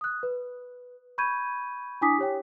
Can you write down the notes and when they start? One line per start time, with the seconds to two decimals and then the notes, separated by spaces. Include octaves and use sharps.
0.01 D#6 F#6
0.23 B4
1.18 B5 C#6 G6 G#6 D#7
2.01 D4 E4 G#5 D6 D#6 B6
2.18 G4 C#5 G5